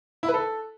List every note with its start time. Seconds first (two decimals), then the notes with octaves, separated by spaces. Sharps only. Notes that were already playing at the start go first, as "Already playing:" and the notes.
0.23 E4
0.28 B4
0.34 A4